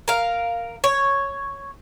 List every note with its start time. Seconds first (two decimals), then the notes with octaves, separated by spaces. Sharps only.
0.08 A#4 F5
0.84 C#5